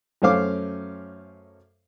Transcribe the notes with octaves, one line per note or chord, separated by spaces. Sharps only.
F#2 A3 C#4 C5 F5 D6